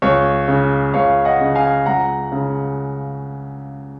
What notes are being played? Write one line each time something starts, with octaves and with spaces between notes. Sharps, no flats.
C#2 C#5
C#3
C#2 C#5 F5
D#5 F#5
C#3
F5 G#5
C#2 F#5 A#5
C#3